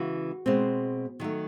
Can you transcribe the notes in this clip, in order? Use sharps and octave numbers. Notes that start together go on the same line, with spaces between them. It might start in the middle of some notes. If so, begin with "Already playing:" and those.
Already playing: C#3 E3 G#3 F#4
B2 G#3 C4
D#3 F#3 A3